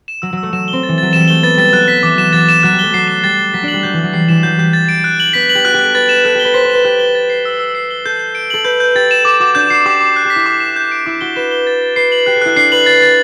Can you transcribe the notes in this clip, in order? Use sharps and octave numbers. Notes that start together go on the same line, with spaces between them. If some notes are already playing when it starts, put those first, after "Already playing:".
E7
F#3 E6
F#3 E6
A3
F#3 E7
G7
C4
A6
E3
F#3 A6
G3 E7
A3 G7
B3 A6
G3 A6
F#3 F#6
B6
E3 D6
F#3 E7
F#3 A6
E7
F#3 F#6
G3
A3 G7
F#3 C7
E7
G3 A6
G7
F#3 B6
D4 F#7
G3
F#3 G6
E3
F#3 G6
G3 C7
E3 E7
F#3 G6
G3 G6
A6
D7
F#6
F#7
B3 B6
F#7
G4
F#4 F#6
G4
A4 F#6
B4 A6
E7
A4 F#6
G4 G7
B4
C5 B6
C5
B4 E7
G4 F#6
G7
A6
C7
E6
E6
C7
G7
A4 G6
G6
D7
A4 F#7
B4 G6
G6
G4 A6
E7
A4 D6
F#4 D6
D4 G6
F#4 C7
G4 D6
D6
F#6
G4 B6
E4
D6
E7
G6
D7
E4 D6
F#4 G7
B4 E7
G7
A6
A6
B4 C7
F#7
G4 F#6
A4
E4 F#6
D4 C7
B4 F#7
A6
A6